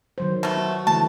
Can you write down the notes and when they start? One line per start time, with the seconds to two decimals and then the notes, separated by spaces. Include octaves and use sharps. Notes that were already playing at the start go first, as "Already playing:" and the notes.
0.18 D#3 F#3 C5
0.43 B2 A3
0.57 F#4
0.87 D3 E3 A3 A5